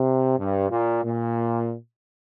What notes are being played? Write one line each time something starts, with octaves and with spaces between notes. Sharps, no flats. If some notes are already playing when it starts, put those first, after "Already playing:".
Already playing: C3
G2
A#2
A#2